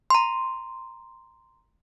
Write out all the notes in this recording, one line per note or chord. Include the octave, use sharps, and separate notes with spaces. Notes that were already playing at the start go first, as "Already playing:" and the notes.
A#5 C6